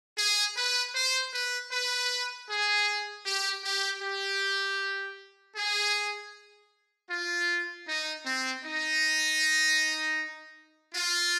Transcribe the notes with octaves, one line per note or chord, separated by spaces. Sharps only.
G#4
B4
C5
B4
B4
G#4
G4
G4
G4
G#4
F4
D#4
C4
D#4
F4